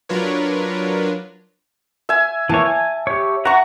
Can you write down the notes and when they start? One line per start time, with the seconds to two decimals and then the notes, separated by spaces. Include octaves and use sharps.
0.09 F#3 D4 F4 A#4 B4 C#5
2.09 E5 G#5
2.49 E3 A#3 C#5 A5
2.65 G#5
3.07 G4 C#5
3.45 F#4 F#5 A#5 C#6